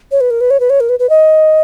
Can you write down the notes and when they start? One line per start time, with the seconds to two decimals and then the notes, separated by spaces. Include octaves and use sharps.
0.12 C#5
0.21 B4
0.30 A#4
0.41 B4
0.50 C#5
0.60 B4
0.70 C#5
0.80 A#4
0.89 B4
0.99 B4
1.10 D#5